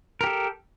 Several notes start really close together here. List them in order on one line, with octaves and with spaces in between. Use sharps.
A#4 G4 A4